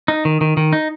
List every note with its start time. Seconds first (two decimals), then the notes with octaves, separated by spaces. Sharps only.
0.08 D#4
0.25 D#3
0.41 D#3
0.57 D#3
0.73 D#4